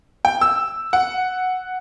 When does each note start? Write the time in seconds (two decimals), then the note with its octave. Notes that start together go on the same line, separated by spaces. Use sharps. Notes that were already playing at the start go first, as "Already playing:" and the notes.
0.25 G5
0.41 E6
0.93 F#5